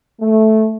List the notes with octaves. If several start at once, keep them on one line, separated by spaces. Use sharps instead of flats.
A3